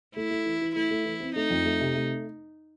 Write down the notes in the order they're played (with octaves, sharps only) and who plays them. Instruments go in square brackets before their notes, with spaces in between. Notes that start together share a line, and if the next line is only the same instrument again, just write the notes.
[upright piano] A3 [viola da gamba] E4
[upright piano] A3
E3
E3
[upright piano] A3 [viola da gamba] E4
[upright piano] A3
E3
C4
[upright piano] A3 [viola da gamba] D#4
[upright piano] F2
A3
C3
A3